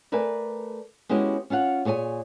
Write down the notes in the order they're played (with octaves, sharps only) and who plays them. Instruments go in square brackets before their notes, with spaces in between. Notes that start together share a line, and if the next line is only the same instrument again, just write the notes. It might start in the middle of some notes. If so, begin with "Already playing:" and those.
[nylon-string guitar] A3 A#4 B4 D5 E5 G#5
G#3 B3 C#4 E4 F#4 G4
C#4 F4 F5 F#5
A#2 G#4 C#5 D5 G#5